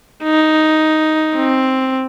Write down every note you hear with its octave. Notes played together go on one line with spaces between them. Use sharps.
D#4
C4